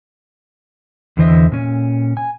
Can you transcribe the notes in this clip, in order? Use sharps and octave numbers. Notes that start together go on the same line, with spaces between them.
E2 D3 E3 C5 D#5 E5
A#2 C#4
G#5